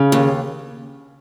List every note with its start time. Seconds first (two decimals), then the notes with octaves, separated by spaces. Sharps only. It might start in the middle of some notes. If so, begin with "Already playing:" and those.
Already playing: C#3
0.12 D#2